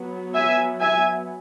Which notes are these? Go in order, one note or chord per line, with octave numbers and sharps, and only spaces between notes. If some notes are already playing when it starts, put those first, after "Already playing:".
Already playing: F#3 B3
E5 G#5
E5 G#5